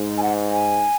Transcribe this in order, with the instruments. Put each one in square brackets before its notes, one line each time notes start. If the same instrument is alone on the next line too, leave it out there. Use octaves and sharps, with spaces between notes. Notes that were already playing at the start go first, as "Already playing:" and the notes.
Already playing: [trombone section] G#2
[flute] G#5
F#5
G#5